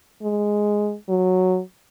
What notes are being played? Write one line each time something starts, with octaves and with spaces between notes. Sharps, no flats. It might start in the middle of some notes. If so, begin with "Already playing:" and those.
G#3
F#3